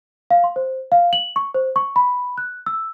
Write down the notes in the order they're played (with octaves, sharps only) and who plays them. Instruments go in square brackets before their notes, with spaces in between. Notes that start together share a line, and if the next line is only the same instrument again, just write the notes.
[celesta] F5
C6
C5
F5
F#7
C#6
C5
C#6
B5
F#6
E6